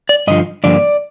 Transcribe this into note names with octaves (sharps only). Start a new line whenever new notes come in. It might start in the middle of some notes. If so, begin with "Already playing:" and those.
D5
G2 D3 F3 D#5
G2 D3 F3 A#3 D5